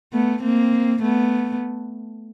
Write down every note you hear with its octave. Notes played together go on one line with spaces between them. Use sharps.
A3 B3
A#3 C4
A3 B3